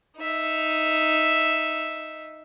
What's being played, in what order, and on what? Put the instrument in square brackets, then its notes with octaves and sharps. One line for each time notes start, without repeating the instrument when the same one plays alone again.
[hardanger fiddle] D#4 E5